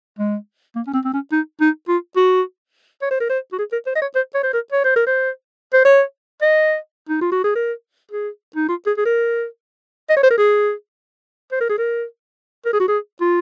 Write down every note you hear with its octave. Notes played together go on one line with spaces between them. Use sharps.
G#3
A#3
C#4
C4
C4
C#4
D#4
D#4
F4
F#4
C#5
C5
A#4
C5
F#4
G#4
A#4
C5
D#5
C#5
C5
C#5
C5
A#4
C#5
C5
A#4
C5
C5
C#5
D#5
D#4
F4
F#4
G#4
A#4
G#4
D#4
F4
G#4
G#4
A#4
D#5
C#5
C5
A#4
G#4
C5
A#4
G#4
A#4
A#4
G#4
F#4
G#4
F4